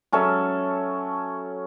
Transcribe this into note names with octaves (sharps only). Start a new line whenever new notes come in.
F#3 C#4 A4 E5